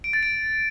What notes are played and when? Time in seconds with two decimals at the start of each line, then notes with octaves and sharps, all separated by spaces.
0.04 D7
0.13 A6
0.23 D7